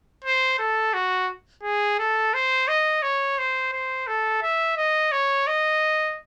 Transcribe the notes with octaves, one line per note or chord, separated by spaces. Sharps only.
C5
A4
F#4
G#4
A4
C5
D#5
C#5
C5
C5
A4
E5
D#5
C#5
D#5